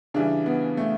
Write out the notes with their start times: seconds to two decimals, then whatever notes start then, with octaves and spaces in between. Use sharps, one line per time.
0.14 C#3 E3 G3 D4
0.46 B3
0.77 A3